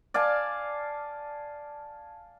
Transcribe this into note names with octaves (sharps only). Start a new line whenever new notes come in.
D5 F5 G#5 A5